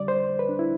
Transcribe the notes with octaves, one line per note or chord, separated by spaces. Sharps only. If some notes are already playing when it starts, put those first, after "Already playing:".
Already playing: F2 D3 G3 D5
C5
B4
D4
E4